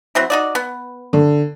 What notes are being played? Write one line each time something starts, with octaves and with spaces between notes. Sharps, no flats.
F#3 C4 E4
D#4 F#4 D5
B3
D3